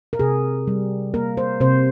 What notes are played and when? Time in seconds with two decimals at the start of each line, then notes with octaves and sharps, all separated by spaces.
0.13 A#4
0.19 C3 G#4
0.67 G3
1.14 A#3 A#4
1.37 C5
1.60 C3 C5